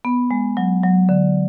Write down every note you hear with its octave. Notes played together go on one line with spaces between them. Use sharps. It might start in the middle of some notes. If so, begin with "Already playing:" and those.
B3
G#3
F#3
F#3
D3